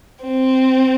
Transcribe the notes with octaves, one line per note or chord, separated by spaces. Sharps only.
C4